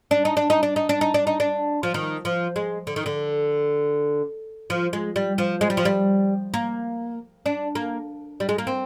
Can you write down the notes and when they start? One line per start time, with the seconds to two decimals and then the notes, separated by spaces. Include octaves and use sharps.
0.11 D4
0.25 D#4
0.37 D4
0.50 D#4
0.63 D4
0.76 D#4
0.89 D4
1.01 D#4
1.14 D4
1.27 D#4
1.40 D4
1.83 F3
1.94 D#3
2.25 F3
2.56 G#3
2.87 D3
2.96 D#3
3.06 D3
4.70 F3
4.93 G#3
5.16 G3
5.38 F3
5.61 G#3
5.70 G3
5.77 F3
5.85 G3
6.54 A#3
7.46 D4
7.75 A#3
8.40 G3
8.49 G#3
8.58 A#3
8.67 C4